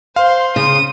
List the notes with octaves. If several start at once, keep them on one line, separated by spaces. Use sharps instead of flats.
C5 F5 C6
C#3 D#6